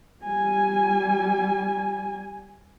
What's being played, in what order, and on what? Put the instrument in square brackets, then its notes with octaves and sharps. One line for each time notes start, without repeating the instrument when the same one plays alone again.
[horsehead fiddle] G3 G#5